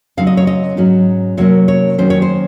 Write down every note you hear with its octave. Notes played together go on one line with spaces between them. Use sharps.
C#3 F#3 C4 D#4 F5
D#5
C#5
D#5
G#2 F#3 C#4
C3 F#3 A#3 C#4 C#5
C#5
D#3 F#3 A#3 C#4 C5
C#5
C5